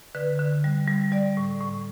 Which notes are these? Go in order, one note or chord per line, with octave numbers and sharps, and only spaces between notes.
D3 B4
D3
G3
G3
G3 D5
A2
A2